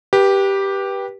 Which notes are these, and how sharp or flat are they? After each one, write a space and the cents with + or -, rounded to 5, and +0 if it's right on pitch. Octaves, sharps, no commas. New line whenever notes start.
G4 +0 B4 -25